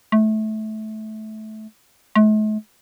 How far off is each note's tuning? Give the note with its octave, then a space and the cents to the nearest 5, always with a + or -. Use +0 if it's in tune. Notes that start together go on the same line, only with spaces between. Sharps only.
A3 -20
A3 -45